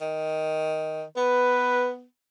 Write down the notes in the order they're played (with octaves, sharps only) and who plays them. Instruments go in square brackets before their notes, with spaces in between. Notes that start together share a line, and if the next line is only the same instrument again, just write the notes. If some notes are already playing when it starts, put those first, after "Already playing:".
[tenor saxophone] D#3
[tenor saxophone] B3 [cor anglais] B4